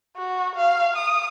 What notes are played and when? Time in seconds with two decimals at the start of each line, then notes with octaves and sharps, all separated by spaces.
0.16 F#4
0.56 F5
0.96 D#6